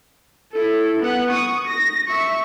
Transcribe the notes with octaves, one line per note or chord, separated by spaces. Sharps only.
E4 A4
B3 F#5
C#6 D#6
A#6
E5 C#6